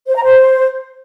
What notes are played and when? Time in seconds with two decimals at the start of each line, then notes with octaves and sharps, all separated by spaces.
0.08 C5
0.15 A#5
0.23 C5